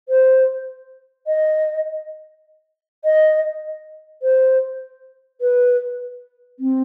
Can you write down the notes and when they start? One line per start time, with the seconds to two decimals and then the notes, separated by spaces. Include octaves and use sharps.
0.09 C5
1.27 D#5
3.05 D#5
4.22 C5
5.41 B4
6.59 C4